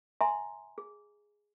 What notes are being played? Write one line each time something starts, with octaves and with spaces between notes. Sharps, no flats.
E5 G#5 A#5 C6
G#4